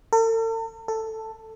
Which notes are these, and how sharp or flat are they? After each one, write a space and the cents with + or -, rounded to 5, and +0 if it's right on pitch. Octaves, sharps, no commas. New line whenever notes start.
A4 +45
A4 +10